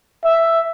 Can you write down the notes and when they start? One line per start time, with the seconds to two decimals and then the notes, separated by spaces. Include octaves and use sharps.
0.24 E5